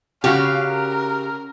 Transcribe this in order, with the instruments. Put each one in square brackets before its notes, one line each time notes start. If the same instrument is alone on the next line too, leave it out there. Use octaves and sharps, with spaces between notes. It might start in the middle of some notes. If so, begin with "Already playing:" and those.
[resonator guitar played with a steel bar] C#3 G4 [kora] C#4 F#4 [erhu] F5
[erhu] A#4